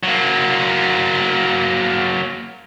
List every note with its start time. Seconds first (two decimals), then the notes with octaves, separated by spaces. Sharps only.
0.03 F#3 A#3